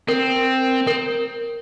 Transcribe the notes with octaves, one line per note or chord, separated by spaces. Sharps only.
C4 A#4
C4 A#4